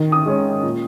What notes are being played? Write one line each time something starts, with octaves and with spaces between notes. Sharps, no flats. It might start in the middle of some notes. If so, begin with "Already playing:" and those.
Already playing: D#3
D#6
G#3 C#4
A#2